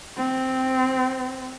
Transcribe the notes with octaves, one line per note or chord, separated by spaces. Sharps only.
C4